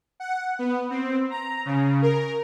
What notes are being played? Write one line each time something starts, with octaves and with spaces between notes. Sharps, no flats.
F#5
B3
C4
A#5
C#3
A#4